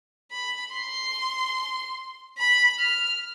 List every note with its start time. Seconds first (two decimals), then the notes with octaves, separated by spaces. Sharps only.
0.31 B5
0.73 C6
2.38 B5
2.79 F6